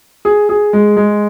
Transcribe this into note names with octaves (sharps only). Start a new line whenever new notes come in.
G#4
G#4
G#3
G#3